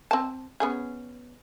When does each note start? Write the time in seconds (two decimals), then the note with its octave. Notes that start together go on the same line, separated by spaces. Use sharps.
0.11 C4 A5
0.60 B3 C#4 G#4